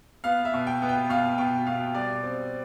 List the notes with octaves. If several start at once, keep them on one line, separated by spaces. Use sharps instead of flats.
B3 F5
E5
B2
G5
B3
G5
B2 F5
B2 G5
B2 F5
G3 D5
C4